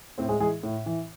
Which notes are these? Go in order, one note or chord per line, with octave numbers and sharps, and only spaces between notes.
A2 C4 C5
G#3 G#4
E3 G#3 G#4
A2
E3